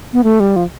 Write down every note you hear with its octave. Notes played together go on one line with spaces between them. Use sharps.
B3
A3
G3
F3